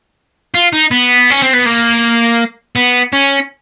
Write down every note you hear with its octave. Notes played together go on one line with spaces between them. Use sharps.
F4
D#4
B3
C#4
C4
B3
A#3
B3
C#4